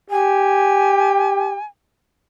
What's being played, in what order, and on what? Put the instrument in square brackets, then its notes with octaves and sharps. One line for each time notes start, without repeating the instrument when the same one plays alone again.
[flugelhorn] G4 [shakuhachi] G#5